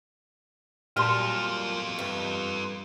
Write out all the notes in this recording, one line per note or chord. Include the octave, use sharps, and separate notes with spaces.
A#2 F#3 G3 F4 A4 C6 F6
G2